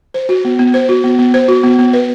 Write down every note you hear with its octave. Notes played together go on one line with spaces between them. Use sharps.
C5
F#4
B3
B3
C5
F#4
B3
B3
C5
F#4
B3
B3
B4